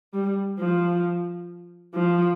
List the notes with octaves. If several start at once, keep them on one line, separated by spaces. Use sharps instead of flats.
G3
F3
F3